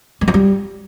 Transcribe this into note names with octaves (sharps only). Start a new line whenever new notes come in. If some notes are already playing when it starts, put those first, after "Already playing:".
G3
F3
G3